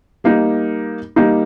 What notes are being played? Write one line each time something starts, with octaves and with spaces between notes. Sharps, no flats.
G3 A#3 D#4
G3 A#3 D#4